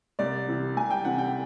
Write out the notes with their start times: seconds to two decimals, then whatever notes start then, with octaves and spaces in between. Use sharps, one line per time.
0.19 C2 D5
0.48 C3 E3
0.77 C2 G#5
0.90 G5
1.05 C3 E3 F#5
1.18 G5